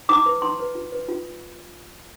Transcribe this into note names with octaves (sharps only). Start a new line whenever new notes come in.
E4 D6
B4
E4 C6
B4
F4
B4
F4